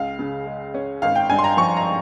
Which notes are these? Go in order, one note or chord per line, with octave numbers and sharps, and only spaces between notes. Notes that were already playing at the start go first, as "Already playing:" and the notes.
Already playing: C#2 F5
C#3
G#3
C#4
G#1 F5
G5
G2 G#5
C6
A#5
F3 C#6
A#5